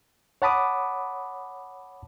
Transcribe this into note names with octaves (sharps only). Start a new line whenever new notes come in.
C#5 F#5 A5 B5 D6 D#6